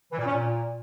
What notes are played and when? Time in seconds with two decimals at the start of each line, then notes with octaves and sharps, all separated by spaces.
0.11 E3
0.18 A#2
0.26 C#4
0.33 A#2